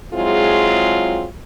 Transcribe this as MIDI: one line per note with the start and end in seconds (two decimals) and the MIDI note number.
0.14 1.26 54
0.14 1.26 56
0.14 1.26 60
0.14 1.26 64
0.14 1.26 65
0.14 1.26 68